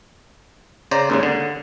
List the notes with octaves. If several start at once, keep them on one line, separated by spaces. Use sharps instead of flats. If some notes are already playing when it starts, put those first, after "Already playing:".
C#3 C5 D5 A#5
D#2 G#2 C#3
D3